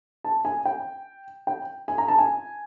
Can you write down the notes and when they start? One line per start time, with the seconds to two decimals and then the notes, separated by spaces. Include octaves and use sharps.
0.24 A5
0.45 G#5
0.65 G5
1.47 G5
1.88 G#5
1.98 A#5
2.08 A5
2.18 G#5